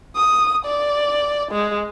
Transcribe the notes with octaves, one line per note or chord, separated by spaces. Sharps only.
D#6
D5
G#3